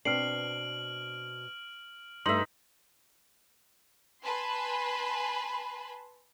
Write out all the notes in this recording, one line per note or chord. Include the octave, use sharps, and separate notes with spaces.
B2 C4 D4 F6 C7 D7 F#7
G2 A3 D#4 E5 C6 F#7
B4 G#5 A5 B5 C6